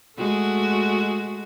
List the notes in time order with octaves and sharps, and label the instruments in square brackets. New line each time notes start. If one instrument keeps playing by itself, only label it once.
[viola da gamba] G#3 A3 F#4